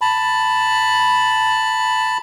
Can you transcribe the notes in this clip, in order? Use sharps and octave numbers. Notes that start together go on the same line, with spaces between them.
A5 B5